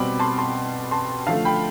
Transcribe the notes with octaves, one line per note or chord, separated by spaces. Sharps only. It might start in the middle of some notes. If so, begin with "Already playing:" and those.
Already playing: B2 G3 C4 B5 D6
A5 C6
A5 C6
A5 C6
D3 F3 A3 F5 A5
G5 B5